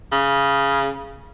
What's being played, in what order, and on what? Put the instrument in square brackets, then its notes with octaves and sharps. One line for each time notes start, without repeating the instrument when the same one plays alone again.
[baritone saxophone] C#3